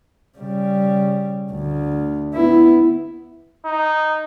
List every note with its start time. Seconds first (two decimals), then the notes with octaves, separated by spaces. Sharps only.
0.38 C#3 G3
1.51 D2
2.35 B3 E4
3.65 D#4